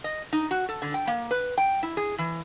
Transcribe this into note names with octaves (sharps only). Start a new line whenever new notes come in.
D#5
D#4
F#4
A4
D3
G5
A#3
B4
G5
E4
G#4
E3